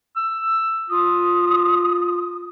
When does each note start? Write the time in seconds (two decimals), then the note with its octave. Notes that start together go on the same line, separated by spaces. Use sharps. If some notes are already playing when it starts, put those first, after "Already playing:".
0.16 E6
0.90 F4 D#6